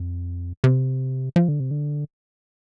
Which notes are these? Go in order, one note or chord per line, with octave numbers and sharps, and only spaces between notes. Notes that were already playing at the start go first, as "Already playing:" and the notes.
Already playing: F2
C3
F3
D3
C3
D3